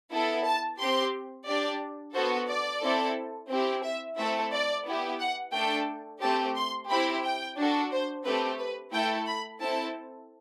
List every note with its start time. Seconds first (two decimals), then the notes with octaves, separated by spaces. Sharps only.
0.11 B3 E4 A4
0.45 A5
0.79 C4 G4 C6
1.47 D4 G4 D5
2.14 B3 F#4 A4 C5
2.48 D5
2.82 C4 E4 A4
3.50 C4 E4 G4
3.84 E5
4.18 A3 C4 E4 A4 E5
4.53 D5
4.85 B3 E4 G4
5.20 F#5
5.53 A3 D4 A4 G5
6.22 A3 C4 G4 A5
6.56 C6
6.89 C4 E4 G4 B5
7.24 G5
7.57 D4 F#4 A4
7.91 C5
8.25 A3 C4 G4 B4
8.58 B4
8.93 A3 E4 A4 G5
9.27 B5
9.60 C4 E4 A4 A5